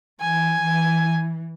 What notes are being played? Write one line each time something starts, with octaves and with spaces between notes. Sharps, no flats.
E3 G#5
E3